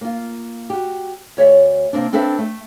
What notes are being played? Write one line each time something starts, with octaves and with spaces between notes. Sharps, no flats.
A#3 F4
F#4 G4
D2 C#5 D5 E5
C3 A#3 C4 D4
C4 D4 A4 B4 C5 E5
A3